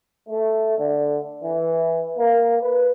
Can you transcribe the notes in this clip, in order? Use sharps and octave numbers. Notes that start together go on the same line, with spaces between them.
A3
D3
E3
A#3
B4